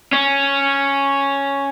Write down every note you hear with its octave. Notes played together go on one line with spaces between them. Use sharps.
C#4